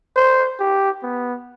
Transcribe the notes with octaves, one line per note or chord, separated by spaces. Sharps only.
C5
G4
B3